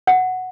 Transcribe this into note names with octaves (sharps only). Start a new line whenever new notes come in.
F#5